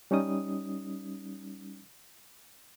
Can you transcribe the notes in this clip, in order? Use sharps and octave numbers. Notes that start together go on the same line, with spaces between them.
G3 C#4 D#4 D#6